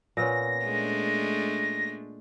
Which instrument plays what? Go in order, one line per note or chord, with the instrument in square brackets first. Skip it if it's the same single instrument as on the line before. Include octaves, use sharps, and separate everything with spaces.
[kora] A#2 B3 C#4 [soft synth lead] A#6
[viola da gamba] G#3 A3 D4